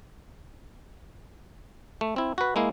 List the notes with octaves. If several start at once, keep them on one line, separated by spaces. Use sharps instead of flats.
A3
C4 E4
F#4 B4
G#3 A#3 E4